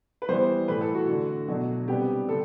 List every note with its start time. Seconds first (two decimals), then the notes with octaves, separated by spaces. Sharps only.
0.22 B4
0.28 E3 G3 B3 C5
0.68 A2 E3 A3 B4
0.81 A4
0.95 F#4
1.08 D3 A3 D4
1.48 B2 F#3 A3 D4
1.88 C3 G3 B3 D4 G4
2.28 D3 G3 A4